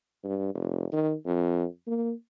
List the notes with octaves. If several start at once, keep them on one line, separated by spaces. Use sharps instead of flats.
G2
F1
D#3
F2
A#3